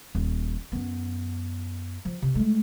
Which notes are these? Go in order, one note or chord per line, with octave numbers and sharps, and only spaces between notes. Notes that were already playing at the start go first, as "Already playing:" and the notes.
D#1
F#2 B3
F3
C3
G#3 A3